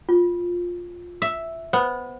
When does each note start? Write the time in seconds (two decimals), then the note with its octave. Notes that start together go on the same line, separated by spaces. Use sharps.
0.09 F4
1.22 E5
1.73 B3 C5